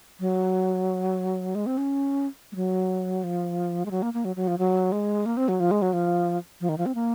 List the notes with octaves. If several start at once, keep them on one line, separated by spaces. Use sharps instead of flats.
F#3
G#3
C4
C#4
G#3
F#3
F3
G#3
F#3
A#3
A#3
F#3
F#3
F3
F#3
G#3
A#3
C4
F#3
F3
G#3
F#3
F3
F3
D#3
F3
C4
A#3